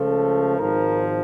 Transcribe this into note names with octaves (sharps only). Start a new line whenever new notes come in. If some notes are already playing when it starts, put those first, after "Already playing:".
Already playing: C#2 C#3 F3 A3 A4
G#1 G#2 F3 A#4